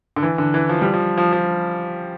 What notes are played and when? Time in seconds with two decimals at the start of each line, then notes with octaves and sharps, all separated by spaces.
0.16 D3
0.22 E3
0.38 D3
0.54 E3
0.69 F3
0.81 G3
0.94 F3
1.18 F3
1.33 F3